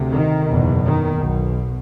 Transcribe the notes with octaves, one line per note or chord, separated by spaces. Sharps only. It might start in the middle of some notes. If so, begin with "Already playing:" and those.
Already playing: D2 C3
D#3
F#1 E2 B2
D#3
B1 B2